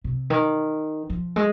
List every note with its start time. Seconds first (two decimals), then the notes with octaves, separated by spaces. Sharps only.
0.04 C3
0.30 D#3
1.10 F3
1.36 G#3